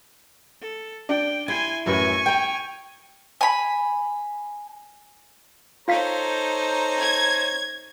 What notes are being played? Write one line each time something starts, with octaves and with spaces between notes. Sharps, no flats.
A4
D4 G5
E4 G#5 C6 G#6
A1 F#2 B4 G#5 C#6
G5 A#5 G6
G#5 B5
D#4 F4 A4 C5 C#5 F5 A#5 B6
G#6